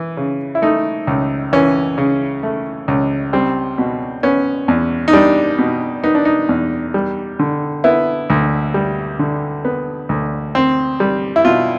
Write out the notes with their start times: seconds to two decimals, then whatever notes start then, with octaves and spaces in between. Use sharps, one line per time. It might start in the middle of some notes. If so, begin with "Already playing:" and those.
Already playing: E3
0.17 C#3
0.55 E4
0.62 A3 D#4
1.07 C#2
1.53 E3 C#4
1.98 C#3
2.43 A3
2.88 C#2
3.33 G3 C4
3.78 B2
4.23 B3 C#4
4.68 E2
5.08 D#4
5.13 G3 D4
5.59 B2
6.04 B3 D#4
6.15 D4
6.25 D#4
6.49 E2
6.94 G3
7.39 D3
7.84 B3 E4
8.30 D2
8.74 G3
9.19 D3
9.65 B3
10.09 D2
10.55 C4
11.00 G3
11.36 E4
11.45 B2 F4